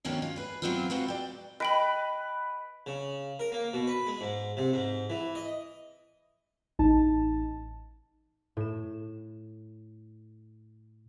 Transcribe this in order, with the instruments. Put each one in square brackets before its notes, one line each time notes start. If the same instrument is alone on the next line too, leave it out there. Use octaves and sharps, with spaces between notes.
[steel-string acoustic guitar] D#2 B2 D#3 F3 C#4 D4
F4
G#4 B4
F#3 G3 B3 C4 E4 F4
G#3 C4 F4 F#4 B4
D5 G5
[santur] B4 [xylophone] D#5 G5 B5
[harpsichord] C#3
A#4
A#3
B2
B4
G#3
G#2
C3
G#2
E3
D#5
[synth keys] A1 D#4 A5
[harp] A2 E7